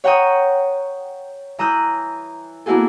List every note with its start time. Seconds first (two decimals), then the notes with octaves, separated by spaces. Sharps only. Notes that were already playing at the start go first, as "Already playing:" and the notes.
0.04 C#5 F#5 G5 A#5 C#6 D#6
1.59 E3 A#5 D#6 E6 F#6 G6
2.66 A#3 B3 E4 F#4 G#4 A4